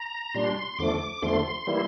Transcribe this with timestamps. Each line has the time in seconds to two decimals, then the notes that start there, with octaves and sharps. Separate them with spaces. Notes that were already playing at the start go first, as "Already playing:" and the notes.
Already playing: A#5
0.34 A#2 G3 D4 C6
0.79 E2 D3 F3 A3 D6
1.22 E2 D3 F3 A3 C6
1.67 E3 G3 A#3 E4